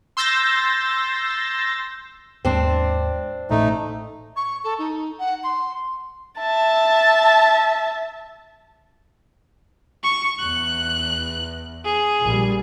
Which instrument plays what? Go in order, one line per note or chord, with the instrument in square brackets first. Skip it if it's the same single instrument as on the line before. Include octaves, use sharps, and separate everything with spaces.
[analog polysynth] C6 E6 G6 A6 A#6
[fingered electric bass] D#2 G#2 G#3 [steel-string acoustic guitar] C4 D4
[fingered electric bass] A1 A2 [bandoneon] A3 D#4
[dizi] C#6
A4
D#4
F#5
C6
[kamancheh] E5 A5
[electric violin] C#6
[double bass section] E2 [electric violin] F#6
[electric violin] G#4
[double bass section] A#1 G3